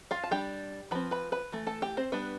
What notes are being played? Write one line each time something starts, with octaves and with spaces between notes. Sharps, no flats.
F4 F5
A5
G3 D4 G4 G5
F3 C4 B4 B5
B4 B5
B4 B5
E3 A3
A4 A5
G4 G5
C4 C5
G3 B3 D4 B4